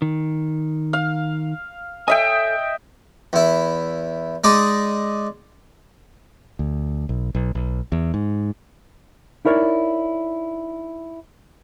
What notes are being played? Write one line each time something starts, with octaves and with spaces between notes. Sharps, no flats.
D#3
F5
A4 C#5 D#5 E5 G5 G#5
E2 E4
G#3 D#4 D5 D#6
D2
B1
B1
B1
E2
G#2
D#4 E4 A#4 C#5 D5